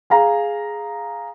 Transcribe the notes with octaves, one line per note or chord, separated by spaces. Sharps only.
G#4 F5 A#5